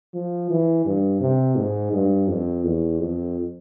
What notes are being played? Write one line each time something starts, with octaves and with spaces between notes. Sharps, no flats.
F3
E3
G2
C3
G#2
G2
F2
E2
F2